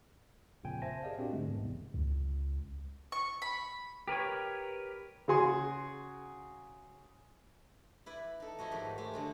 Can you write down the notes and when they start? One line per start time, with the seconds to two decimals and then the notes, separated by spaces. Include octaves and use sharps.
0.64 A#1 F2 A#2 C#3 G5 G#5
0.82 C5 E5 G#5 A5 A#6
1.03 G4 G#4 A#4 D5 D#5 F5
1.18 A#2 C4 D4 F#4 G4
1.32 G#2 D3 G#3 A3
1.48 B1 E2 G#2 C3
1.94 C#2
3.12 C#6
3.42 B5
4.08 G4 A#4 B4 C#5
5.28 C#3 F#4 G#4 C6
8.06 E4 B4 D5
8.40 D#4 A4
8.58 F3 E4 F#4 D#5
8.71 G#2 D#3 F#3 G4
8.98 G#3 A3 G4
9.13 D3 F#3 A3